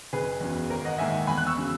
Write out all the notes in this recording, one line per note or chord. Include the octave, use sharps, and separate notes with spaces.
F#1 G#4 B4
E2 C#3 F#3
G#1 A#4
D#5 F#5
G#2 D#3 A#3 E5 G#5
E2 G#5 B5
F#6
C#6 E6
C#3 F#3